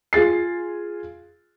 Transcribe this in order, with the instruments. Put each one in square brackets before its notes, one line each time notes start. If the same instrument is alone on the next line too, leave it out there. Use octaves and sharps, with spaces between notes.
[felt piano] F4 G#4 A6 C7